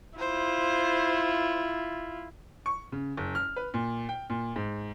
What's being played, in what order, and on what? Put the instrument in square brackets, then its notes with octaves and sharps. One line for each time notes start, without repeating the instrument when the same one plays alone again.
[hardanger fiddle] E4 F4 [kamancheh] C5
[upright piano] C#6
C#3
F#1
F6
B4
A#2
G5
A#2
G#2